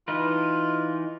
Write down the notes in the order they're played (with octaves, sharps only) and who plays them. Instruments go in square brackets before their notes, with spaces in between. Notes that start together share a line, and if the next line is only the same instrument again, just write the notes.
[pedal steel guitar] E3 D#4 B4 [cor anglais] F4